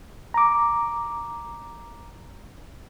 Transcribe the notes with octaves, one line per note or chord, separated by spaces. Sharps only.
A#5 D6